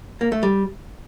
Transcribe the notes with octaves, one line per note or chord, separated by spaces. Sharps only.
A#3
A3
G3